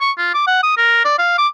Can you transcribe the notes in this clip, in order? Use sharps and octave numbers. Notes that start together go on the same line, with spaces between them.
C#6
F4
D6
F#5
D#6
A#4
D5
F5
D6